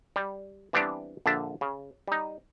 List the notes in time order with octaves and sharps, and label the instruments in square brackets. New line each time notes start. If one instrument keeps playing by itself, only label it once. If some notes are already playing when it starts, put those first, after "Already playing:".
[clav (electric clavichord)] G3
E3 G3 B3 C4 D4 G4
A#1 D3 D4 E5 A5
C#3
G3 D#4